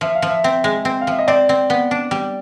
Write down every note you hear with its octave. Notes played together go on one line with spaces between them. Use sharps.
F3 E5
F5
F3
E5
C4 E5
G#3
C4
F5
F3 E5
D#5
C4 D5
C4
B3
D4
G3